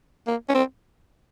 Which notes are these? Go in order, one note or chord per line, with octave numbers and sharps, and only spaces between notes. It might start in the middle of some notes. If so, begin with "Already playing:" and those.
A#3
C#4
C4